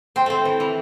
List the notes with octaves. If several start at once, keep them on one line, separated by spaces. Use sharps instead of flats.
C4 C5 G5 C6
A3 C4
E3
E3